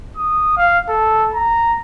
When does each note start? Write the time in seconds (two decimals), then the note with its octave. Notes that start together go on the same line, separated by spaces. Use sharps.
0.17 D#6
0.57 F5
0.89 A4
1.34 A#5